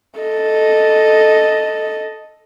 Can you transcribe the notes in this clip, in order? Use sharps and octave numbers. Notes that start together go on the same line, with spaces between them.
A4 D#5